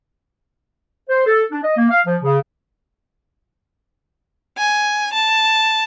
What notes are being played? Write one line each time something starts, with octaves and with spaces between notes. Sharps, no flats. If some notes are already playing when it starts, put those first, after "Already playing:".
C5
A4
D4
D#5
A#3
F5
F3
C#3
G#5
A5